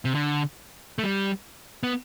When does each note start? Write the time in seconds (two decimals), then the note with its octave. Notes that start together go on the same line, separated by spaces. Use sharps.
0.05 C3
0.15 D3
0.98 A3
1.04 G3
1.83 B3